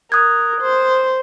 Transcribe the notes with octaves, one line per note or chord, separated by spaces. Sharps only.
A#4 D#6 F#6 G#6
C5